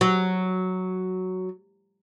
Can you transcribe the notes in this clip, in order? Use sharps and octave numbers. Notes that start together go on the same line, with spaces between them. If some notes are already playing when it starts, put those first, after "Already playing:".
F#3